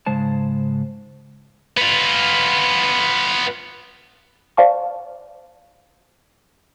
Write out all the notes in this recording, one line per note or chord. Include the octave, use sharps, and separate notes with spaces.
G#2 C#3 G#3 C5 A5
B3 F4
C5 D5 F5 A5 C#6